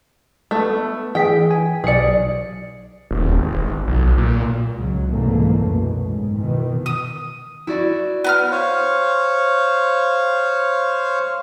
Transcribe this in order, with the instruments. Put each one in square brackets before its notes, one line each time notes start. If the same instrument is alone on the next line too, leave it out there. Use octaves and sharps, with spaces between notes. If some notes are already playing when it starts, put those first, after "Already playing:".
[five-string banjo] A3 B3
[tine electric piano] E3 G#4 B6 [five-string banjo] G5
[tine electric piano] G#5
[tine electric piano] B1 C#7 [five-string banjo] G#4 D5
[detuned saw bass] D#1
G#1
B1
A#2
[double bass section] C#2 F#3
C2 G#2 B2 E3 A3 A#3
F#2 B2
G#2
B2 D#3 E3
[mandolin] D#6
[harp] E4 F#4 D5
[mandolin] B3 A#5 F6
[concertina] C5 C#5 F5